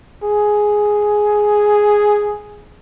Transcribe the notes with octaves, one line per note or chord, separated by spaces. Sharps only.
G#4